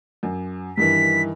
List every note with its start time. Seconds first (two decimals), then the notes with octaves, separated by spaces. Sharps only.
0.23 F#2
0.77 G2 D#3 E3 B6